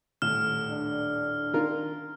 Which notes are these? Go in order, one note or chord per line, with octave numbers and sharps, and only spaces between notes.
D#1 A2 F6 E7
D4
D3 D#3 F4 A#4